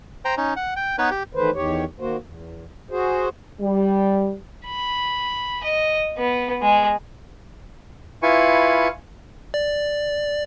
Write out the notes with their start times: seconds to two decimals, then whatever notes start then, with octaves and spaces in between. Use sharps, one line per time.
0.25 C5 G5 A#5
0.37 C#4 D#4
0.56 F#5
0.76 G5
0.98 B3 D#4 B4 C#5
1.11 G4
1.35 D#3 E3 A3 B4 C5
1.54 E2 D#3 G4 C#5
2.00 D#3 A#3 F#4 C5
2.20 E2
2.91 F#4 G#4 C5
3.61 G3
4.66 B5
5.64 D#5
6.18 B3
6.62 G#3
8.23 E4 F4 B4 G#5 C#6
9.54 D5